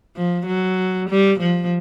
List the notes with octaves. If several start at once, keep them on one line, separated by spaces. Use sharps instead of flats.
F3
F#3
G3
F3